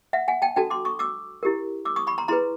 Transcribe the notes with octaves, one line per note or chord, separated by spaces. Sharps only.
E5 F#5
F#5 G#5
G5 A5
D4 F#4 A4 G5 A5
C6 D6
C#6 D#6
D6 E6
E4 G4 A#4
D6 E6
C#6 D#6
B5 C#6
A#5 C6
E4 G#4 B4 A#5 C6